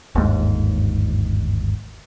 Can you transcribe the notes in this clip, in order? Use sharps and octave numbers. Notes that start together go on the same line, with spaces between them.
G1 D#2 G#2